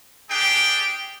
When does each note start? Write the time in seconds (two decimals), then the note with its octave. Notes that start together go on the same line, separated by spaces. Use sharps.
0.30 D4 G4 G#4 G5